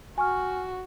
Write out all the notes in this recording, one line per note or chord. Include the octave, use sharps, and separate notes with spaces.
F#4 G#5 C#6 F6